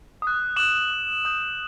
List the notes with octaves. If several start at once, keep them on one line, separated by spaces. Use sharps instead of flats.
D#6 F#6
D6 F#6 E7 F#7
D6 F#6
D#6 G6